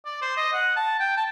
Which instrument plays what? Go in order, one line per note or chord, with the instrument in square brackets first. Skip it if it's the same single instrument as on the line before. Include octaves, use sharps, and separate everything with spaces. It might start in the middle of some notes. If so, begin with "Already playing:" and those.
[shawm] D5
C5
D#5
F#5
A5
G5
A5